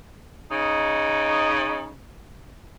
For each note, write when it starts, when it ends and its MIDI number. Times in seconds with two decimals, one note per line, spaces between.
0.50 1.92 49
0.50 1.92 63